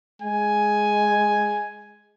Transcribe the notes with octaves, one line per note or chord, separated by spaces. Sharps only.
G#3 G#5